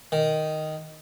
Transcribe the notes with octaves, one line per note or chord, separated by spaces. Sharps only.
D#3